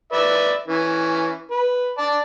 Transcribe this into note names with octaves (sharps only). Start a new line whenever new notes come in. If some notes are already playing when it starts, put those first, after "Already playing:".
B4 D5 E5
E3 C#4
B4
D5 A5